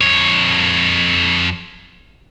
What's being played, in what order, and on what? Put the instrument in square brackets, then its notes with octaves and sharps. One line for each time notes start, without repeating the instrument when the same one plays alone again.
[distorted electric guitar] F2 C#5